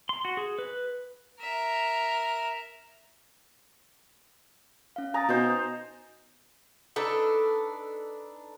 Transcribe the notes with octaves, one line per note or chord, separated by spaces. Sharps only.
C6
F#4
G#4
B4
A#4 E5
C#4 F5
G#5 A#5 D#6 A6
B2 D#4 C5
D4 D#4 A4 B4